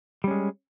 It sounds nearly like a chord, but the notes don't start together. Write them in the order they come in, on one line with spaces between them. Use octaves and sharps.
G3 C#4 G#3